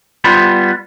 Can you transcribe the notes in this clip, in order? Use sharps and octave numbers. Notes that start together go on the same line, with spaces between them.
G3 B3 F4 B5